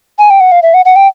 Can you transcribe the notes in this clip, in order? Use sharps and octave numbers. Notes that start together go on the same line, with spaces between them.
G#5
G5
F#5
F5
E5
F#5
F#5
G5